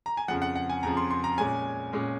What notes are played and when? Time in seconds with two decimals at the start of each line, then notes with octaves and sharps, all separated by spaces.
0.06 A#5
0.17 G#5
0.28 F2 C#3 F3 F#5
0.42 F#5
0.56 F#5
0.70 G#5
0.83 F2 C#3 F3 A#5
0.97 C6
1.10 C6
1.24 A#5
1.38 A#2 G#3 C#4 G#5
1.93 A#2 G#3 C#4